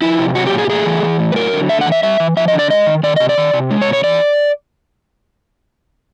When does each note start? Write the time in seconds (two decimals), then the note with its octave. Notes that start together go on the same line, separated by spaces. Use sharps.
0.02 F3 E4
0.19 C3
0.35 F#3 F#4
0.47 G4
0.52 A#2
0.58 G#4
0.65 G4
0.70 A3 G#4
0.86 E3
1.03 E3
1.19 A2
1.32 B4
1.36 F#3 A#4
1.53 D3
1.69 A3 E5
1.81 F#5
1.86 E3
1.92 E5
2.03 G3 E5
2.20 E3
2.37 F3 E5
2.48 D#5
2.53 D3
2.59 D5
2.70 G#3 D#5
2.86 D#3
3.03 D#3 D5
3.16 C3 D#5
3.29 D5
3.38 D#3
3.53 C3
3.71 G#3
3.82 C#5
3.88 B2
3.93 C#5
4.04 E3 D5